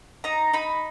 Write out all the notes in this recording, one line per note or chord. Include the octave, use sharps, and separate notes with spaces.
D#4 A#5
D#4 B5